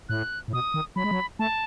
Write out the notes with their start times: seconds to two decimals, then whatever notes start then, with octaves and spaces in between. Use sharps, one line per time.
0.09 A2 F#6
0.48 A2
0.53 B2 D#6
0.74 D#3
0.96 F#3 B5
1.04 G#3
1.11 F#3
1.39 A3 A5